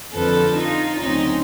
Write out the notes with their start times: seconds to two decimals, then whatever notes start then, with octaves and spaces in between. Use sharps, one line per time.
0.13 F2 D3 F3 A4 B4
0.56 D#4 F4
1.00 D2 C#3 F#3 A3 C4 C#4 D#4